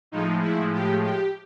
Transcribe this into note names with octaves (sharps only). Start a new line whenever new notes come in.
A2 F3 G#3 D#4
E4
G4
G4